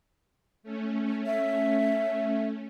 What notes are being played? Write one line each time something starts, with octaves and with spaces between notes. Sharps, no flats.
A3 C#4
E5